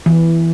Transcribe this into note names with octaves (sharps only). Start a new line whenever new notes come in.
E3